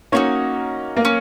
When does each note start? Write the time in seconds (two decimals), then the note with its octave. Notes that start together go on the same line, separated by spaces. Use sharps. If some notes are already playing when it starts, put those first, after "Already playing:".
0.12 A#3 C#4 D#4 F#4 C#5
0.96 A#3
1.05 C#4